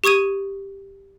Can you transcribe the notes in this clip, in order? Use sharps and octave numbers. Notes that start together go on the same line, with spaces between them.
G4 C#6 D#6 G#6 D#7